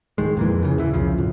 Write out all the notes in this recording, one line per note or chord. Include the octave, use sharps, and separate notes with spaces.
D1 D#3 G#3
F2 A#2 E3
C#3
E2 E3
C2 C#3 F3
D1 F#2